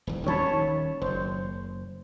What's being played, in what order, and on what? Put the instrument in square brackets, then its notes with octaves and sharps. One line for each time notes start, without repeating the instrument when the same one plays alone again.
[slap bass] D#1 E2
[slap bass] D#1 D#3 C#4 [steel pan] C#5 A5 B5
[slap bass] F#1 [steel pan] C5